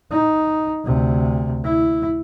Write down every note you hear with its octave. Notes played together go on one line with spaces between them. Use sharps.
D#4
D2 C3
E4